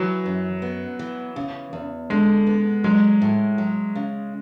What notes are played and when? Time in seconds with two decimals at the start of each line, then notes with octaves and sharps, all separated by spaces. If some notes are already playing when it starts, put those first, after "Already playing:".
Already playing: E3 F#3
0.26 F#2
0.62 B3
0.99 E3
1.36 C#3
1.73 E2
2.10 D3 G#3
2.47 B3
2.84 F#3 G#3
3.22 A2
3.58 F#3
3.95 C#3